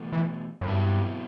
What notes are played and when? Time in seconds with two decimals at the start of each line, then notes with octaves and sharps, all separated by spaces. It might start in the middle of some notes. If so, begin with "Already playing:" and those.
Already playing: E2 B2 A3
0.13 E3
0.61 F#2
0.67 G2 B2 F#3 C4 E4